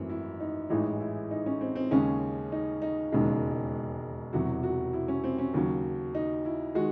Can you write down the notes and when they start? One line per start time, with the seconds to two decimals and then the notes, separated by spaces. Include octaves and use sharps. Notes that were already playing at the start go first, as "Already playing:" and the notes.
Already playing: G#1 F#2 E3 A3 C4
0.09 E4
0.40 D#4
0.70 A1 G#2 E3 G#3 D#4
1.00 E4
1.31 D#4
1.46 C#4
1.61 C4
1.76 C4
1.91 D#2 C#3 G#3 C#4
2.52 D#4
2.82 D#4
3.12 E1 D#2 C#3 G#3
4.33 E1 E2 C3 F#3 F#4
4.63 F#4
4.93 E4
5.08 C#4
5.24 C4
5.38 C#4
5.54 D#2 C#3 F#3
6.15 D#4
6.45 E4
6.75 D#3 G#3 F#4